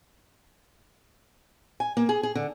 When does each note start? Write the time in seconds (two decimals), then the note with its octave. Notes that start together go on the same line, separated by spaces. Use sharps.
1.80 G#5
1.97 A#3
2.09 G#4
2.23 G#4
2.35 D3